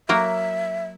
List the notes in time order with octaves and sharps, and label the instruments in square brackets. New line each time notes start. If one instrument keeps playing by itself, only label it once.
[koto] F#3 A#3 A#4 [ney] E5